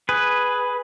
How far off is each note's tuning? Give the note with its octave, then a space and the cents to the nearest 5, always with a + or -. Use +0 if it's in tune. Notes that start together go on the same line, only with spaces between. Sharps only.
G#4 +0 B4 +0